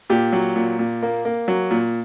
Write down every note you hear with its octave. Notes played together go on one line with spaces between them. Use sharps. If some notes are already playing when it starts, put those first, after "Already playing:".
A#2 G4
F#3
A#2
A#2
A#3
A#3
F#3
A#2